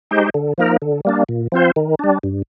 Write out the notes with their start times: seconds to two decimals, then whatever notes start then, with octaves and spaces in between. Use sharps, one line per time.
0.11 G#3 D#4 G4 C5
0.34 D3
0.58 F3 A#3 D#4 A#4
0.82 D3
1.05 G3 A#3 D4
1.29 A#2
1.52 F3 C4 F4 C5
1.76 D#3
1.99 G3 D4
2.23 G2